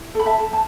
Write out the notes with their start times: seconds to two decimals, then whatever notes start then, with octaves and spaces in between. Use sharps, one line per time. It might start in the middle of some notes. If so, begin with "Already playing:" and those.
Already playing: E4
0.15 A4 B5
0.26 E5 A5
0.38 A4
0.53 A5